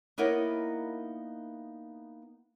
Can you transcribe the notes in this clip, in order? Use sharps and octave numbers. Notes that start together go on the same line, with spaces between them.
A#3 B3 D#4 E4 A#4 C#5